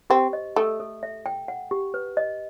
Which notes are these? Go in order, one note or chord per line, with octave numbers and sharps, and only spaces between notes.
C4 G4
D#5
A3 A4
A4
E5
G5
F#5
G4
B4
D#5